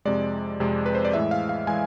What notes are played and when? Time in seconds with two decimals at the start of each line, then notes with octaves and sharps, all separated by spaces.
0.05 F2 C3 G#3 D5
0.60 F2 C3 G#3
0.86 B4
0.95 C5
1.05 D5
1.13 A2 E3 G#3 E5
1.31 F5
1.49 F5
1.67 E3 G#3 G#5